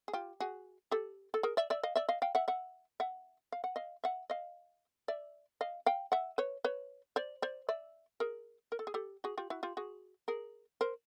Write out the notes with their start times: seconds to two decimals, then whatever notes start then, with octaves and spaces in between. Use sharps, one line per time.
0.08 G#4
0.13 F4 G4
0.40 F#4 G#4
0.91 G4 A4
1.34 A4
1.43 G#4 A#4
1.57 D5 E5
1.70 D5 E5
1.83 D#5 F5
1.96 D5 E5
2.09 D#5 F5
2.22 F5 G5
2.35 E5 F#5
2.48 E5 F#5
3.00 E5 F#5
3.52 F5
3.64 F#5
3.76 D#5 F5
4.04 E5 F#5
4.30 D#5 F5
5.08 D5 E5
5.61 D#5 F5
5.86 F5 G5
6.12 E5 F#5
6.38 B4 C#5
6.64 B4 C#5
7.16 C5 D5
7.42 C5 D5
7.69 D5 E5
8.20 G#4 A#4
8.72 A#4
8.79 A4
8.87 G#4
8.94 G4 A4
9.24 F#4 G#4
9.38 F4 G4
9.50 E4 F#4
9.63 F4 G4
9.77 F#4 G#4
10.28 G#4 A#4
10.81 A#4 C5